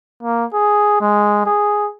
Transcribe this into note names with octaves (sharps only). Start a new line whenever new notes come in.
A#3
G#4
G#3
G#4